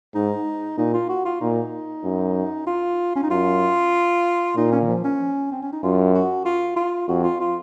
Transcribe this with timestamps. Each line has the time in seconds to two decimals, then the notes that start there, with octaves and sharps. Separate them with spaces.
0.15 G#2 D#4
0.78 A#2 D#4
0.94 F4
1.09 F#4
1.25 F4
1.41 A#2 D#4
2.04 F#2
2.67 F4
3.16 C#4
3.23 D#4
3.30 F#2 F4
4.56 A#2 D#4
4.71 C#4
4.81 D#3
4.87 F3
5.04 C#4
5.51 C4
5.62 C#4
5.72 D#4
5.83 F#2 F4
6.14 F#4
6.45 F4
6.76 F4
7.08 F2 F#4
7.24 F4
7.40 F4